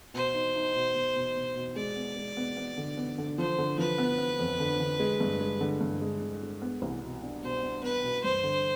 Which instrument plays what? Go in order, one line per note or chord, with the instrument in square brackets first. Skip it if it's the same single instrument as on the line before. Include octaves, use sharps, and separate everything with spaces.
[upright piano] B2 [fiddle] C5
[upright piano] D#4
D#4
B2
B2
B2
B2
B2
[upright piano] G#3 [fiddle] D5
[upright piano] B3
G#3
B3
B3
D3
B3
D3
[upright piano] F3 [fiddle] C5
[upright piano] D3
[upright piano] F3 [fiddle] B4
[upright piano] B3
B3
F2
D3
D3
G#3
G2
G#3
D3
G2
G#3
D3
G#3
B3
C2
B2
D4
[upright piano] B2 [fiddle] C5
[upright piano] D4
[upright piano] B3 [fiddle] B4
[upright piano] B2
[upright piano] G2 [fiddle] C5
[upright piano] D3